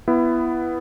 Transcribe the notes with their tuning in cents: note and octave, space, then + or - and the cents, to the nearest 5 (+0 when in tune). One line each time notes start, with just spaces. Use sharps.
B3 +0 E4 +20